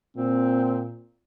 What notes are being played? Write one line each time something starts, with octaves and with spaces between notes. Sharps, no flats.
A#2 C4